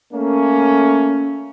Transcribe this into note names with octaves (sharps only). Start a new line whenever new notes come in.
A3 A#3 C#4